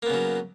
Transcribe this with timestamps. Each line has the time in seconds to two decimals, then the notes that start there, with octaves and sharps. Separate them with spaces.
0.02 A#3
0.06 B3
0.10 C#3
0.14 F#3